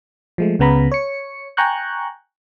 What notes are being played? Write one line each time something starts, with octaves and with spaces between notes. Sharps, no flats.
F3 G#3 A3
C#2 C#3 B3 A#5 B5
C#5 C#7
G5 G#5 A#5 C#6 F#6 G6